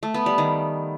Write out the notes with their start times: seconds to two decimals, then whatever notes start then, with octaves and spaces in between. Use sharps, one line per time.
0.03 A3
0.14 B3
0.26 G3
0.38 D#3